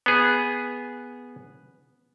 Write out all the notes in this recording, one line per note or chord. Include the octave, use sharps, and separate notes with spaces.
B3 G#4